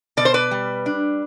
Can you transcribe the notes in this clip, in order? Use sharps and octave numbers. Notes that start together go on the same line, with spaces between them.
B2 D5
C5
B4 D5
G3
D4